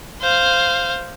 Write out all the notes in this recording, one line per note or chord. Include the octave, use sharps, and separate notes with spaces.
C5 F5